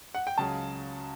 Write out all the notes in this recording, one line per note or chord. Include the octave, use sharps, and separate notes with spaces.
F#5
G5
C#2 C#3 F#3 A5